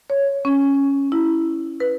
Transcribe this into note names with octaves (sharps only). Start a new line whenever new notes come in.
C#5
C#4
E4
B4